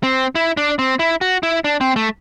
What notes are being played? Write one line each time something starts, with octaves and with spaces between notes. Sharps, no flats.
C4
E4
D4
C4
E4
F#4
E4
D4
C4
A3